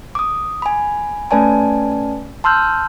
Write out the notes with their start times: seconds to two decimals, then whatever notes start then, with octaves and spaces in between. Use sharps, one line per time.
0.15 D6 D#6
0.62 G#5 B5
1.31 A3 C#4 B4 D5 G#5 A5
2.44 A5 C6 E6 F6 G6